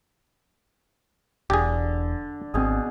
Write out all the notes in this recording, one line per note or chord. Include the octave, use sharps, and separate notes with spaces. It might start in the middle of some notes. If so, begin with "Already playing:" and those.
E1 D3 G4 G#4
G#1 B2 C4 G#4